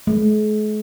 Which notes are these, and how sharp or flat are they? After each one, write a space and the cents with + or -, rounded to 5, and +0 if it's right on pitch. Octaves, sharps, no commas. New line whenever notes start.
G#3 +45